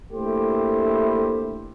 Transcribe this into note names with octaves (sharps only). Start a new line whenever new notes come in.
A3 A#3 D4 E4 G4 C5